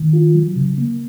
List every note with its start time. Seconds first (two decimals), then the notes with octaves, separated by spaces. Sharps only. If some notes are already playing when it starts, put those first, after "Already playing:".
Already playing: D#3
0.13 F4
0.35 F#3
0.56 C#3
0.78 A#3